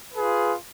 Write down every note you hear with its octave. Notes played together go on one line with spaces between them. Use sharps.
F4 G#4 B4